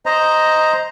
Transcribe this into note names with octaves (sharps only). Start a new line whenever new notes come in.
C5 D#5 A#5